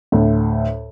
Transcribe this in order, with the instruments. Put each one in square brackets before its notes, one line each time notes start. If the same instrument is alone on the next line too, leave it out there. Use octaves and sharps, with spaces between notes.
[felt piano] D2 A2